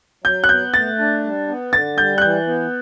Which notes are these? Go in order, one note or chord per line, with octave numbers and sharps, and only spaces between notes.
F#3 G6
F#6
B3 G6
A3 A6
D4
G3
B3
D3 A6
G3 G6
F#6
E3 G6
B3